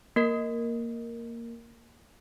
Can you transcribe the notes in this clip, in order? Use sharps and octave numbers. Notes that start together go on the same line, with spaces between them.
A#3 A#4